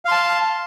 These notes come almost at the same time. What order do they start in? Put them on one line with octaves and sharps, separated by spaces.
F5 C6 A5